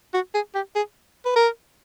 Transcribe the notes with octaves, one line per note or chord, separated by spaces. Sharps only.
F#4
G#4
G4
G#4
B4
A#4